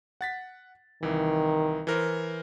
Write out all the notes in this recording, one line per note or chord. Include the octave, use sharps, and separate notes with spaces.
F#5 A6 B6
C2 D#3 E3
E3 A#4 C5